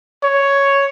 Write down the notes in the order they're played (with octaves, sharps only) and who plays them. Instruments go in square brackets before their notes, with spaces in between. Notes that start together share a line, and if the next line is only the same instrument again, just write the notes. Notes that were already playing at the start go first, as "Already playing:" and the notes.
[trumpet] C#5